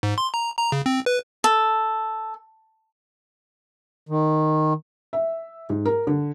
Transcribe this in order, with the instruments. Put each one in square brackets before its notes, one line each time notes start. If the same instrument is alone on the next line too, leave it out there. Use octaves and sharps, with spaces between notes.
[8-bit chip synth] G#2
C6
A#5
A#5
C#3
C4
B4
[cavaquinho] A4
[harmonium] D#3
[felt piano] E5
G#2
A#4
D3